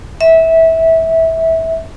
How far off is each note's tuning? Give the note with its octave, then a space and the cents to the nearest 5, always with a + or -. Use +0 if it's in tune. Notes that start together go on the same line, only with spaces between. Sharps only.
E5 -20